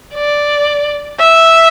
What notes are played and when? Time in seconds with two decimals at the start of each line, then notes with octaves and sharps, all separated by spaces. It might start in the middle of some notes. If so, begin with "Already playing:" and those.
0.14 D5
1.20 E5